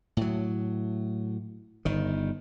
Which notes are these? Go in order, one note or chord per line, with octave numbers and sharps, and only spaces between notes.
A2 F#3
G1 D#3